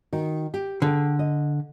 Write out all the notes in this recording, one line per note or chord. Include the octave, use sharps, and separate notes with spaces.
D#3 F#4
G4
D3 G#4 A4 G5
D#5